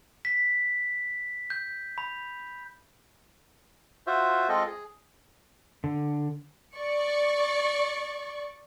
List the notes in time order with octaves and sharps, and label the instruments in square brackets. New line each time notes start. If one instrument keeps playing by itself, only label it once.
[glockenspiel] B6
G6
B5
[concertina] F4 F#4 C5 E5
G#3 C4 F4 A4 D#5
G#4
[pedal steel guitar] D3
[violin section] D5 C#6